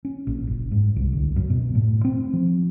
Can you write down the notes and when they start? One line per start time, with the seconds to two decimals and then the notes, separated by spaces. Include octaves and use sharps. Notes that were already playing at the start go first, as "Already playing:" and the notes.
0.05 C#4
0.27 A#1
0.47 F#1
0.71 G#2
0.96 C2
1.13 D2
1.36 F#2
1.50 B2
1.75 A2
2.05 C4
2.34 F3